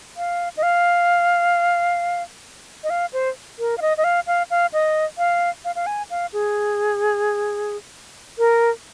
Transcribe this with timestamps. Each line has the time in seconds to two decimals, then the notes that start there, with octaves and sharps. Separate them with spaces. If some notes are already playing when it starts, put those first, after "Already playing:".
0.17 F5
0.57 D#5
0.63 F5
2.84 D#5
2.90 F5
3.13 C5
3.59 A#4
3.78 F5
3.82 D#5
3.97 D#5
4.04 F5
4.27 F5
4.50 F5
4.73 D#5
5.18 F5
5.65 F5
5.76 F5
5.87 G#5
6.10 F5
6.33 G#4
8.38 A#4